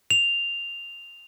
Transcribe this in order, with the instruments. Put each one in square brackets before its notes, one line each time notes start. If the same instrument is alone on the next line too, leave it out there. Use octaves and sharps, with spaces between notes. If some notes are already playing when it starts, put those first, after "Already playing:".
[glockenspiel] F7